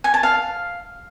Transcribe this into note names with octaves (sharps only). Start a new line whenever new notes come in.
G#5
A5
F5